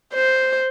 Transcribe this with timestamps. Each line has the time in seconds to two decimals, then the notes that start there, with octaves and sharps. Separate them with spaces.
0.14 C5